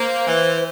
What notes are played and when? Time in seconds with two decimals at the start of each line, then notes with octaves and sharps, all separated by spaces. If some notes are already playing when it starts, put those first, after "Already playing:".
Already playing: A#3 C5
0.26 E3